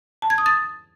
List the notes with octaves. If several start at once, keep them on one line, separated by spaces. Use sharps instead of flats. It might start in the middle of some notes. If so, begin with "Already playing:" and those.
A5
G#6
D#6
A6